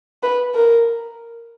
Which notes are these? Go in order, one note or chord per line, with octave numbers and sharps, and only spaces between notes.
B4
A#4